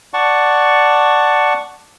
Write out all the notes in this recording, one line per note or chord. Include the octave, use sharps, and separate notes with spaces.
D5 F#5 A5 C#6